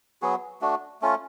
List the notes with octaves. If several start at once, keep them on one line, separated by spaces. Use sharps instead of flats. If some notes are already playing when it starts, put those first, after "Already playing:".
F#3 B3 F#4 G#4
A3 D4 F#4
A3 C#4 F4